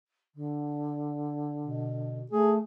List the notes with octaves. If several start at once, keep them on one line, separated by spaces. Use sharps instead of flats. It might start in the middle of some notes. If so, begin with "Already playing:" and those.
D3
B2
A3 G#4